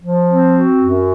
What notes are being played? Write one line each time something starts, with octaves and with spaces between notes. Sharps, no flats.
F3
C4
F#4
F#2